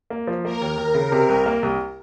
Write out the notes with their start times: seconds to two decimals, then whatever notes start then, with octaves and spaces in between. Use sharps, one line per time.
0.10 A#3
0.27 F3
0.45 A#3 A#4
0.61 D#2
0.78 D#2
0.95 C#3
1.12 C3
1.29 C2
1.46 A#3
1.63 C2